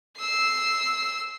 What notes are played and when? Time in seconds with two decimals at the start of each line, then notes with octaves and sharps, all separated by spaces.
0.18 E6 C7